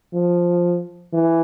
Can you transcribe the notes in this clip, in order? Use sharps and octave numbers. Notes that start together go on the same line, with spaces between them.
F3
E3